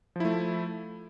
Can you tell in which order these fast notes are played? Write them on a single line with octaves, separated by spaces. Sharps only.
F3 E4 A3